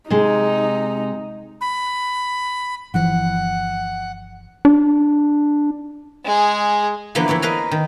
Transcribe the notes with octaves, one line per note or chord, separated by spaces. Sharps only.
C3 G#3 D#4
B5
G1 E3 F3 F#5
D4
G#3 G#4
D3 E3 F3 A#3 B3
E3 E4 C#5 D5
A#4 B4 D#5 F5 G#5 A#5
D#3